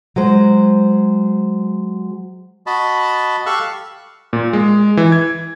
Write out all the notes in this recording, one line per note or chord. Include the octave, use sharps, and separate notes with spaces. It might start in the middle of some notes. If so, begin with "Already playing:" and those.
F#3 G#3 C5
F#4 D#5 A5 B5
G4 A4 F5 C#6 E6 F#6
A#2
G#3
E3
G#6